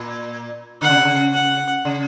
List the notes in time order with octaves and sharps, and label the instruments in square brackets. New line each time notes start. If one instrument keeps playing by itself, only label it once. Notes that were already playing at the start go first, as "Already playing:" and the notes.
Already playing: [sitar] A#2
[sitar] D3 [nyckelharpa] F#5
[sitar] C#3
C3
C#3
[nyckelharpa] F#5
[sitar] C#3